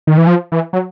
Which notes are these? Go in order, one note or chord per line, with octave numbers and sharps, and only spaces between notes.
D#3
E3
F3
E3
F#3